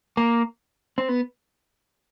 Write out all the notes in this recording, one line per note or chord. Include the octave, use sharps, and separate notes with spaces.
A#3
C4
B3